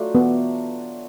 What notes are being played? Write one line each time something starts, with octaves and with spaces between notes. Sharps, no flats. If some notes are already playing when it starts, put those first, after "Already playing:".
Already playing: F#3 A3 D4 F4
B3